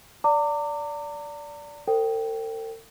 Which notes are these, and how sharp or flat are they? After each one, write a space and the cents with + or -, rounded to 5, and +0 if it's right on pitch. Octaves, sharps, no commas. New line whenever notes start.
D5 -15 A#5 -40 D6 +0
A4 +45 C5 +0 G5 -10